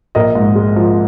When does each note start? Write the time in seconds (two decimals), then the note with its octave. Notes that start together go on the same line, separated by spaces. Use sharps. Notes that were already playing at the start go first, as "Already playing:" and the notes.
0.15 A#1 A#4 D#5
0.35 G#2
0.55 G#3
0.76 F3